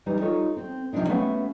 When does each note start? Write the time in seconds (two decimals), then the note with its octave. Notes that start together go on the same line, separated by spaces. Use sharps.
0.06 E3 G3 D#4
0.21 D#4 F4 A4 C#5
0.57 C4
0.93 C3 F3 A3 C4 D4 D#4
1.09 A3 B3 C#4 F#4 E5 F5